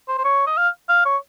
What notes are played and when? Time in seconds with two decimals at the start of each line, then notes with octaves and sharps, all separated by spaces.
0.08 C5
0.18 C5
0.25 C#5
0.47 D#5
0.57 F5
0.89 F5
1.06 C#5